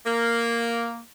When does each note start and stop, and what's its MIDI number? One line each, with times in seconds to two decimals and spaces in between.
0.05 0.99 58